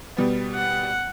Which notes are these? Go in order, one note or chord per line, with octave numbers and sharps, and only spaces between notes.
B2 G3 B3
F#5